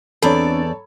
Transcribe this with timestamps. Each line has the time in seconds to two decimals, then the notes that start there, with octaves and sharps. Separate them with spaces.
0.22 E2 C4 D4 A4 C#5 D5 A#5 B5